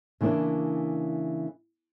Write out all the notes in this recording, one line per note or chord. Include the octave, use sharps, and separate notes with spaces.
C#3 E3 A#3 D4 E4